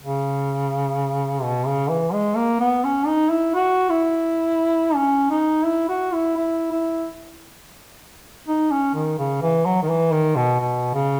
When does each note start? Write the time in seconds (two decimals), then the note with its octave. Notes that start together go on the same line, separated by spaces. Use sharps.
0.02 C#3
1.43 B2
1.67 C#3
1.90 E3
2.13 G#3
2.37 A#3
2.60 B3
2.84 C#4
3.07 D#4
3.31 E4
3.55 F#4
3.90 E4
4.95 C#4
5.31 D#4
5.66 E4
5.89 F#4
6.13 E4
6.37 E4
6.72 E4
8.48 D#4
8.71 C#4
8.95 D#3
9.19 C#3
9.42 E3
9.66 F#3
9.83 D#3
9.89 E3
10.12 D#3
10.36 B2
10.60 B2
10.94 C#3